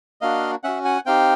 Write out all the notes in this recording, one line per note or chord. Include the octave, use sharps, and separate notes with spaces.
A#3 D4 F#4 D#5 F5
C#4 F#4 E5 F#5
F#5 G#5
C4 D#4 G4 F5 G5